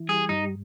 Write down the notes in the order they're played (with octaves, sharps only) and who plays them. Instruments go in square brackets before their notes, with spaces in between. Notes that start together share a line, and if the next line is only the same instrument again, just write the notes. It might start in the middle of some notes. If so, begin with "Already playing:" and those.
Already playing: [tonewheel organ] E3
[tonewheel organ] G3 [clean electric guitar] G#4
[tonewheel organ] G2 [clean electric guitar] D#4